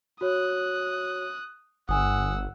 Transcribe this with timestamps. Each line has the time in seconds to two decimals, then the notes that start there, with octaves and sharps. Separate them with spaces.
0.21 F#4 C#5 D#6 F#6
1.89 G1 F#5 G#5 D#6 E6